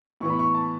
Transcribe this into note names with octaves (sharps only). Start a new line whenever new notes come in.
A2 E3 B3 C#6
B5
C#6
A5